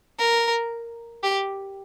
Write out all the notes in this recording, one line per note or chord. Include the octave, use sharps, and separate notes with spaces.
A#4
G4